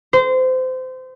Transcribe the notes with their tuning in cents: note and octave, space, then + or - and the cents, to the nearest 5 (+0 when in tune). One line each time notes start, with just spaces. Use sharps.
C5 -25